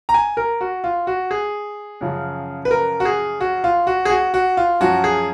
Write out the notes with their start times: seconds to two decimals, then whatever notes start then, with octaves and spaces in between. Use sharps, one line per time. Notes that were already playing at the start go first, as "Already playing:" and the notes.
0.09 A#5
0.14 G#5
0.37 A#4
0.61 F#4
0.84 F4
1.07 F#4
1.31 G#4
2.01 F#2 C#3 F3
2.65 B4
2.71 A#4
3.00 F#4
3.05 G#4
3.41 F#4
3.64 F4
3.87 F#4
4.05 G#4
4.10 F#4
4.34 F#4
4.57 F4
4.80 F#2 F3 F#4
5.04 G#4